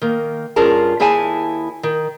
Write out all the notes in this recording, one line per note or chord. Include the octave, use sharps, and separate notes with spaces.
D#3 A#3
G2 C#4 F4 G#4 A#4 A5
D#2 E4 G#4 E5 G#5 A5
D#3